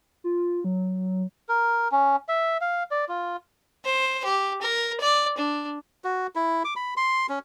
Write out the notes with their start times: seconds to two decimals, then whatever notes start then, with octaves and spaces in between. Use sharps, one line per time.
0.24 F4
0.64 F#3
1.49 A#4
1.92 C#4
2.28 E5
2.61 F5
2.91 D5
3.09 F4
3.85 C5
4.25 G4
4.61 A#4
5.00 D5
5.37 D4
6.04 F#4
6.35 E4
6.65 D6
6.76 B5
6.97 C6
7.29 C#4